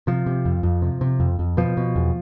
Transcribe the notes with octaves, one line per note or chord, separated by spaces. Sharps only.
C3 F3
C3
F2
F2
C3
C3
F2
F2
B2 F3
B2
E2